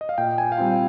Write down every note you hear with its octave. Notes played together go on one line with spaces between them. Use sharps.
D#5
F5
A#2 G5
G#5
F5
G3 C4 F4 G5